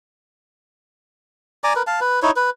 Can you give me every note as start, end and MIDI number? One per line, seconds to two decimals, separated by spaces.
1.64 1.73 74
1.64 1.73 80
1.64 1.73 82
1.64 1.73 86
1.75 1.82 70
1.75 1.82 71
1.87 2.00 77
1.87 2.00 81
2.01 2.20 71
2.22 2.31 63
2.22 2.31 64
2.22 2.31 73
2.36 2.50 71